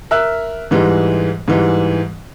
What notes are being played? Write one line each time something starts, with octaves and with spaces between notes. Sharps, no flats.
A#4 E5 E6 F#6
G#2 E3 G3 G#3
G#2 E3 G3